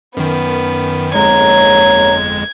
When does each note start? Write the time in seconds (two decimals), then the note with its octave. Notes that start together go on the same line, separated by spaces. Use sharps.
0.17 F#2 D#3 B3
1.15 G1 F2 G#2 G#3 A#3 C#5 A#5 G#6